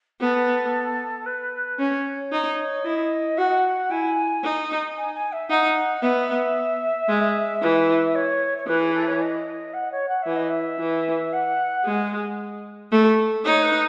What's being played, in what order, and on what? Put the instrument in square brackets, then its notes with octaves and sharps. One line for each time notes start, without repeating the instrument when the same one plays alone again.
[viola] B3 [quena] A4
[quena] B4
[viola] C#4 [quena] C#5
[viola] D#4
[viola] E4 [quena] D#5
[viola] F#4 [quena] F#5
[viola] E4 [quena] G#5
[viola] D#4
[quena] G#5
G#5
E5
[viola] D#4 [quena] F#5
[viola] B3 [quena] E5
[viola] G#3
E3
[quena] C#5
C#5
[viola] E3 [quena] B4
[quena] G#4
A4
C#5
D#5
F#5
C#5
F#5
[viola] E3 [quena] E5
[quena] D#5
E5
[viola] E3
[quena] F#5
[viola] G#3
A3
[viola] D#4 [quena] C#5
[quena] B4